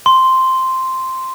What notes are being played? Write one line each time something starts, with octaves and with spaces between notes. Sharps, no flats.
C6